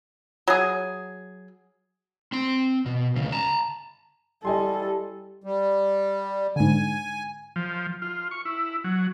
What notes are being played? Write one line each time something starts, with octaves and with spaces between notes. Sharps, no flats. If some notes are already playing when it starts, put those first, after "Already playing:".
F#3 G#4
C4 C6
B2
D2 C#3
A5 A#5
G3 E4 G4 A4 D#5 G#5 C6
G3
G#2 D3 G#5
F3
F4
C#6
E4
F#3